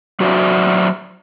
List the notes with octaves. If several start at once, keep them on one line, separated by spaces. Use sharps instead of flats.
F#3 F#4 C5 D5 E5